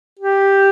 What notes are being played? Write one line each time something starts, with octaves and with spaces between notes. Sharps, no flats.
G4